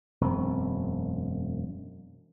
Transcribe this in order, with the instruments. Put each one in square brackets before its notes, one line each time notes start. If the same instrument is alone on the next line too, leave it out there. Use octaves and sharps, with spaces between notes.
[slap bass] E1 F#2 C4